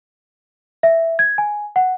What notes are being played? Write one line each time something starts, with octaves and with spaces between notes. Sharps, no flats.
E5
G#6
G#5
F#5